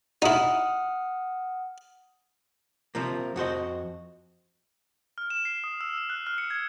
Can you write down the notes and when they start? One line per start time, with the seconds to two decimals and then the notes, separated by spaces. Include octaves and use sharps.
0.22 D#4 E4 F#5 D#6 F6
2.95 C3 F3 A#3
3.36 F2 F#4 C5 D#5
5.18 F6
5.30 E7
5.45 C7
5.64 D#6
5.81 E6
5.98 E7
6.10 F#6
6.27 F6
6.38 C#7
6.50 G#6